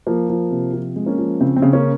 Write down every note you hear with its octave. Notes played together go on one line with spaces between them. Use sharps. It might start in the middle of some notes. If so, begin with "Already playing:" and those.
F3 A#3
F3
C3
F3 C4
G#3
A#3 C#4
F3
C#3 C4
C4
C#3
A#3 C#4